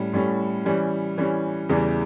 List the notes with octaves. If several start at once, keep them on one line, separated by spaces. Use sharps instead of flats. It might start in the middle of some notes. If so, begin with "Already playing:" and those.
Already playing: A2 G3 C#4
A2 G3 C#4
E3 G3 C#4
E3 G3 C#4
E2 C#3 E3 G3